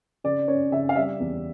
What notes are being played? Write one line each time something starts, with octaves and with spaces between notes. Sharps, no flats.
C#3 D5
C#4 C#5
C#3 E5
F5
G3 E5
E2